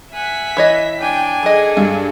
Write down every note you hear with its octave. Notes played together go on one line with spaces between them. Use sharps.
E5 F#5 G#5 B6
E3 C#5 D#5
D4 G5 G#5
F#3 G#4 A4 D#5
G2